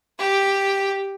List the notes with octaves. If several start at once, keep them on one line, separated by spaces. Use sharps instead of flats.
G4